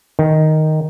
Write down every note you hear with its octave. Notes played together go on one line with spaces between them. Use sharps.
D#3